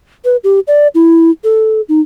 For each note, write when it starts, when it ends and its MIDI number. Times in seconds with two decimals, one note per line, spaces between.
0.25 0.37 71
0.44 0.60 67
0.67 0.87 74
0.95 1.30 64
1.44 1.81 69
1.89 2.00 63